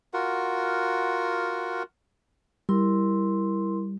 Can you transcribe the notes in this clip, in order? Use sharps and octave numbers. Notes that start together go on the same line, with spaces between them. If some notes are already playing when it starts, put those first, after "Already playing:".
F4 F#4 A#4 F#5
G3 E4 A#4 C6